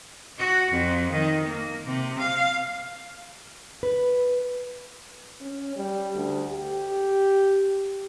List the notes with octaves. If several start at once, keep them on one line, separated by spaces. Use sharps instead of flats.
F#4
F2
D#3
A#3
C3
F5
B4
C#4
G3
D2
G4